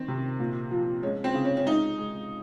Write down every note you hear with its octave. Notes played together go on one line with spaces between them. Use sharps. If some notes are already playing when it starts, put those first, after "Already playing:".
Already playing: D#3 C4
C3
A#2
F3
G#3 C#4
C4
C#3
C#4
C#4
G#3 D#4
G#3